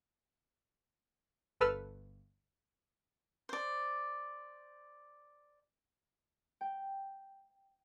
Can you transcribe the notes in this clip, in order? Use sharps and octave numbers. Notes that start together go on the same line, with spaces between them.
G1 A4 B4 E6 F6
C5 D5
G5